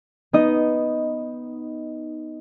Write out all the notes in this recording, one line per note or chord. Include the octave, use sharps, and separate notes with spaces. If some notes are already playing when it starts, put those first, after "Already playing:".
B3 D#4 D#5